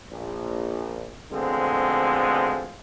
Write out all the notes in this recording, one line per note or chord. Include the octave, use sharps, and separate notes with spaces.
A#1
B2 D3 F3 G#3 A3 C4